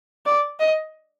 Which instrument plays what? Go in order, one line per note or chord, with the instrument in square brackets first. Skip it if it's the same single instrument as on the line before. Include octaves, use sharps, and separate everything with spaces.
[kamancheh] D5
D#5